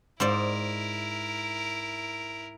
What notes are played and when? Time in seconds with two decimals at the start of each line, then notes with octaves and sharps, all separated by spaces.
0.20 G#2 E4 A#4 C5 D5